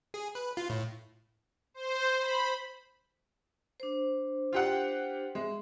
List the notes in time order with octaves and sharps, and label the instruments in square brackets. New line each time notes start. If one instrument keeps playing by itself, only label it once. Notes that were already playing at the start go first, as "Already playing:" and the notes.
[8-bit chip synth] G#4
B4
F4
A2
[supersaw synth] C5
B5
[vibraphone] D4 C5
[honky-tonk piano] F4 G4 F#5
[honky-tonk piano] G#3 [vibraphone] E5